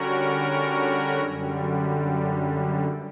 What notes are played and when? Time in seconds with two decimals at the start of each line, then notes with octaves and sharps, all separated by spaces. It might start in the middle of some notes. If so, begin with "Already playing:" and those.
Already playing: D3 G3 C#4 F#4 A#4
1.21 F#2 D3 G3